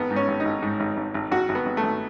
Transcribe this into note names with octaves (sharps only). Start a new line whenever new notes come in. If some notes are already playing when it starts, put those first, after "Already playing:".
Already playing: G#1 B3
G#2
C#4
G#1
D#4
G#1
G#2
G#1
G#1
G#1
G#1 F#4
G#1
B3
G#1
A3
G#1